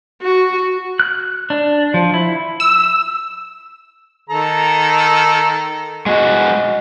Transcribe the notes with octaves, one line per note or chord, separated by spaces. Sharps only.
F#4
F#6
D4
F3
E4
E6
D#3 A4 A#5
G#3 F#4 D#5